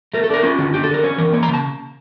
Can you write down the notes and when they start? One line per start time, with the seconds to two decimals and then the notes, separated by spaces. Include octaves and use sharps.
0.14 A3 A#4
0.24 A4
0.29 D4 A#4
0.43 C#4 F4
0.59 D3 F4
0.74 D4 G4
0.83 A4
0.89 D3 A#4
1.03 C#4 C#5
1.18 E3 A#4
1.33 A#3 C#5
1.43 A#5
1.48 C#3
1.54 A5